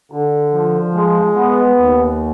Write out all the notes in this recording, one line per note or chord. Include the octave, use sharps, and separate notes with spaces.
D3
F3
G#3
B3
D#2